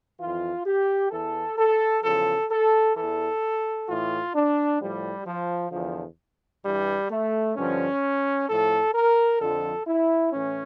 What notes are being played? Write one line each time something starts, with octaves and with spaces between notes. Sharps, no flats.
F2 E3 F4
G4
E2 E3 A4
A4
E2 C#3 F3 A4
A4
E2 E3 A4
A2 E3 F4
D4
A2 F3 G3
F3
E2 D3 F3
G2 E3 G3
A3
G2 D3 F3 C#4
A2 F3 A4
A#4
F2 D3 F3 A4
E4
A2 E3 C#4